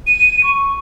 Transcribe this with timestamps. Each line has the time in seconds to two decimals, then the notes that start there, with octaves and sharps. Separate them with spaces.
0.07 D#7
0.43 C#6